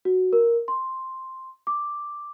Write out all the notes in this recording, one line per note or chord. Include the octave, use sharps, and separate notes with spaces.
F#4
A#4
C6
D6